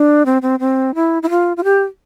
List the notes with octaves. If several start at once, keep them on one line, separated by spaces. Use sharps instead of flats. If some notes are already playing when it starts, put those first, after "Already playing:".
Already playing: D4
C4
C4
C4
E4
E4
F4
F4
G4